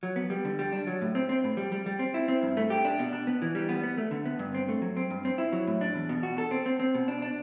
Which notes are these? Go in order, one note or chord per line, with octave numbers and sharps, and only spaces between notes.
F#3
B3
G3
D3
G3
D4
F#3
A2
C4
C4
A2
G3
G3
G3
C4
E4
C4
G2
A3
G4
D4
B2
D4
B3
E3
G3
B3
B3
A3
D3
B3
G2
C4
A3
F#3
C4
G2
C4
E4
F#3
A2
D4
E2
B2
F#4
A4
C4
C4
C4
B2
D4
D4